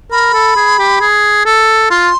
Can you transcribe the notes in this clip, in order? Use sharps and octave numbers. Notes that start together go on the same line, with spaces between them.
A#4 B5
A4
G#4
G4
G#4
A4
F4 C6